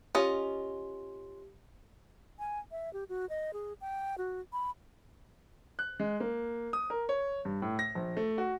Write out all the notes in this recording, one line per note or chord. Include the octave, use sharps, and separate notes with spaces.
C#4 F4 G4 D#5
G#5
E5
G4
F#4
D#5
G#4
G5
F#4
B5
F#6
G#3
A#3
D#6
A#4
C#5
G2
A2
A#6
A#1
A3
F#4